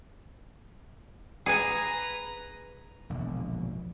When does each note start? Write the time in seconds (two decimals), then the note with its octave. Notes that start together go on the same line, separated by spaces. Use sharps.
1.46 G#4 B4 G#5 A#5
3.10 E1 A#1 D3